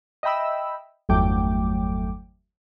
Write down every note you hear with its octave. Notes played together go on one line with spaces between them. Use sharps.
D#5 E5 G5 B5 E6
G1 E2 F#3 A3 G5 D6